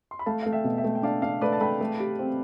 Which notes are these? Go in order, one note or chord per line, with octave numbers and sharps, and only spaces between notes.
C6
B5
A3 F5 A5
A3 F5
E5 G5
B2
E5 G5
A3
G5
D4 D5 F5
D4 D5 F5
A3 B4 D5
A5
A3 G5 B5
A3
G4
C4